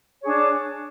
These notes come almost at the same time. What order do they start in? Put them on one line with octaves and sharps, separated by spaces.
C#5 G#4 D4